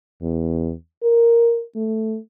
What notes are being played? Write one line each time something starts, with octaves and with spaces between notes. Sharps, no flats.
E2
A#4
A3